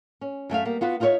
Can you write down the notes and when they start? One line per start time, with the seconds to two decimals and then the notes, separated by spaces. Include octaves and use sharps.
0.21 C#4
0.50 F#2 A3 E5 F5
0.65 G3 A#3 B3
0.81 B3 F4 F#4 B4
1.00 D#4 F4 G#4 C5 C#5 E5